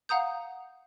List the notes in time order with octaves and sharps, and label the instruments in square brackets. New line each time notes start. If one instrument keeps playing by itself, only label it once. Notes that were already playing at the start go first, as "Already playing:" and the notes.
[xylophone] F5 F#5 A#5 D#6 G6